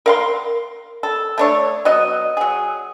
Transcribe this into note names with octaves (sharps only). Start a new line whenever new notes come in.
A#4 F5 C6
A4
A3 D4 C#5
F#3 B3 D#5
F#3 G#4